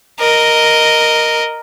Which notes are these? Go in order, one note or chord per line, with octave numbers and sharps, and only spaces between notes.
A#4 D#5